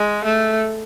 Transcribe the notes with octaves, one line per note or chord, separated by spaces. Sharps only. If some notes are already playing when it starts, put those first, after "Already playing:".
Already playing: G#3
A3